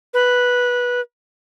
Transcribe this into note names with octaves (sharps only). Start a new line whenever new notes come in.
B4